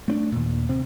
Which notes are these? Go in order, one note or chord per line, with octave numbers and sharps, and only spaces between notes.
A3 C4 D4
D#2 A#2
C3 C4